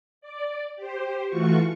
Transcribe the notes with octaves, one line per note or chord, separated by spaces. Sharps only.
D5
G4 C5
E3 A3 F4 F#4 C#6